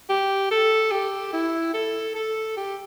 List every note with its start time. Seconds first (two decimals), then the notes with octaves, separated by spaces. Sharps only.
0.09 G4
0.51 A4
0.91 G4
1.33 E4
1.74 A4
2.15 A4
2.57 G4